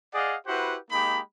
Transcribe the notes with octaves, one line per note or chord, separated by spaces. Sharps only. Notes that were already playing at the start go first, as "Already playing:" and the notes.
G#4 D5 D#5 F5 F#5
E4 F#4 G4 B4 C5 F#5
G#3 A#3 D#4 G4 B5